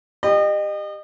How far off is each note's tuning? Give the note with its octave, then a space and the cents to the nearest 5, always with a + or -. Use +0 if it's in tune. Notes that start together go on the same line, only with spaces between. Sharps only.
G4 +15 D#5 -35